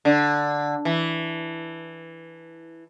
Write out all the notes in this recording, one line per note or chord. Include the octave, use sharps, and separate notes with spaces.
D3
E3